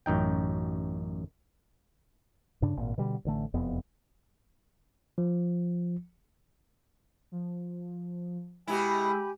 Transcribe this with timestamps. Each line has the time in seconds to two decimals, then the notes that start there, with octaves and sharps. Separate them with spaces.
0.06 A1 F#2 D#4 G5
2.62 G2 C#3 D4
2.77 G#1 A#2
2.98 B2 D3 G3
3.25 A1 D3 A3
3.54 E1 F2 C3 B3
5.18 F3
7.32 F3
8.68 B2 G#3 E4 G4 G#5 B5